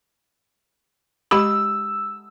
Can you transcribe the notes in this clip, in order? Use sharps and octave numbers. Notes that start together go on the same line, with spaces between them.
G#3 G4 B5 E6